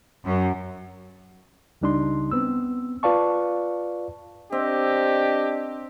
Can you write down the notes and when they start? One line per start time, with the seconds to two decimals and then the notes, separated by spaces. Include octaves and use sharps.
0.25 F#2
1.81 C#2 C#3 G3 D4 D#4 C6
2.31 B3 C4 E6
3.03 F4 B4 D5 F5 A5 C#6
4.52 C4 D4 G4 D#5